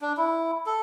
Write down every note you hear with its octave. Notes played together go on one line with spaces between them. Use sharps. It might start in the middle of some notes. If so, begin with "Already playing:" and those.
D4
E4
A4